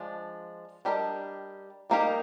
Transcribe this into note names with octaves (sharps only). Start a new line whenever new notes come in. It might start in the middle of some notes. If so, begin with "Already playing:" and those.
Already playing: F3 G#3 D4
G3 D4 G4 A#4 D#5
G3 A#3 D#4 G4 A#4